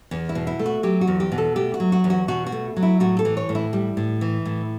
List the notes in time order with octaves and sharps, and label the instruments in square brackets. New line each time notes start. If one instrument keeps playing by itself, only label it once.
[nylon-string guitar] E2
E4
B2
E4
A3
F#4
F#3 G4
F#4
E2
G4
B2
A4
A3 G4
F#4
F#3
F#4
E2
F#4
B2 F#4
F#4
A3
F#3
E4
A2 F#4
A4
E3
C#5
A2
E4
G3
A2
E3
A2